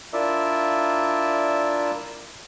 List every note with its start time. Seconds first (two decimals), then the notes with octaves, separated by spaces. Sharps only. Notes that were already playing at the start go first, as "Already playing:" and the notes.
0.13 D4 E4 F4 A#4 D5 E5